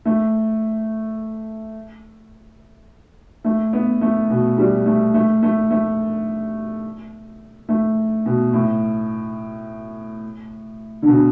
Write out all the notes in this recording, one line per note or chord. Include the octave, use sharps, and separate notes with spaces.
A3
A3
B3
A3
B2
G3
A3
A3
A3
A3
A3
B2
A2
D3
B2